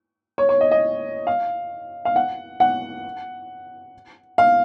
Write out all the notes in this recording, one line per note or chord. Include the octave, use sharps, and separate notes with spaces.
C#5
C#5
D#5
D#5
F5
F5
F#5
F#5
F5